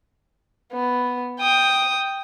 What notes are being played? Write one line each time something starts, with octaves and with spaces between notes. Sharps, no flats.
B3
G5 D#6